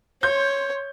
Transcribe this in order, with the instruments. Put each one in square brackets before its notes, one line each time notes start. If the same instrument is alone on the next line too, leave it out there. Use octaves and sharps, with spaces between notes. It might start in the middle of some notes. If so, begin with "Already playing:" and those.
[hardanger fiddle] C#5 [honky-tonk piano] C6 G6